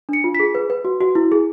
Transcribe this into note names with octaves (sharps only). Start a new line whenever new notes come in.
D4 C#7
F4
B6
G#4
B4
B4
F#4
F#4
E4
G#4